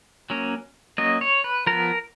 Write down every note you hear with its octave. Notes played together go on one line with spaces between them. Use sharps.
F#3 A#3 C#4
F#3 A#3 C#4 D#5
C#5
B4
F3 B3 A#4